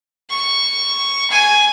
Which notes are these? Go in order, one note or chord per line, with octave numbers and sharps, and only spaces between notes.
C#6
G#5